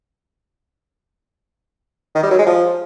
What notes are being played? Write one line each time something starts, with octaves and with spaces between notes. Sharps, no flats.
D#3
G3
F#3
G#3
F3